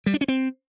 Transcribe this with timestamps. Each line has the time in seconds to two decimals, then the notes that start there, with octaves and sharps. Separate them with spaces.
0.06 G3
0.14 D4
0.21 C#4
0.28 C4